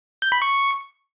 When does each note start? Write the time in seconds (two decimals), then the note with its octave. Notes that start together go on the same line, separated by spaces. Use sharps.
0.22 G6
0.32 B5
0.42 C#6